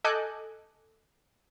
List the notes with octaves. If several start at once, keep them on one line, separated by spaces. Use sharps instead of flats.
A4 D#5 G#5 D6 F#6 G6